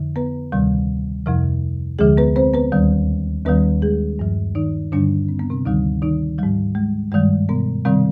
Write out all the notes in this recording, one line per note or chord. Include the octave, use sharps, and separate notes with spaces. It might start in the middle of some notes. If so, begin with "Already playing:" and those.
Already playing: F2 D3 F3
B3 B4
D2 C3 D#3 G3
F2 C3 F3
D2 D3 F3 G#3 G#4
B3 B4
C4 C5
B3 B4
D#2 D#3 G3
D#2 D#3 G3 B3 B4
G#3 G#4
G2 F3
D#3 D#4
G2 D3 G3 D4
C4
B3
C3 C4
D2 D3 D#3 G3 D#4
D#3 D#4
G#2 F3 G3
G#3
G2 D#3 G3 G#3
B2 B3
C3 D#3 G3 C4